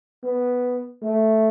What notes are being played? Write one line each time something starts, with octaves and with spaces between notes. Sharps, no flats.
B3
A3